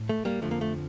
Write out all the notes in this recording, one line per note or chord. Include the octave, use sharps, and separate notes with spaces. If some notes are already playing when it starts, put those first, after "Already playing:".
Already playing: A2
A3
G3 A#3
F2 D3 F3 A3
A#3
A3